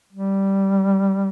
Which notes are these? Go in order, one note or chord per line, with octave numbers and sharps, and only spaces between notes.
G3